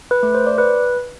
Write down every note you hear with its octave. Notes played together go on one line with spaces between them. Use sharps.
B4
A3
C5
D5
B4